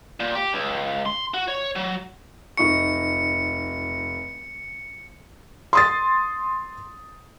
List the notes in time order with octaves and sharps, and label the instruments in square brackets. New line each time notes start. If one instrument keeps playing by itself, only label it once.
[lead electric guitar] A#2
G4
C#2
C6
F#4
C#5
F#3
[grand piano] F1 D#4 C#6 [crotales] C#7
[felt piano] C6 D#6 A6